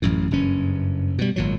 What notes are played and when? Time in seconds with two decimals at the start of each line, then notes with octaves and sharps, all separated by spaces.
0.02 A1 F#2 A2
0.31 F#1 G2 C#4
1.18 B2 G3
1.36 G#1 A#2 F#3